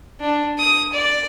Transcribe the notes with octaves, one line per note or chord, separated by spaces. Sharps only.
D4
D#6
D5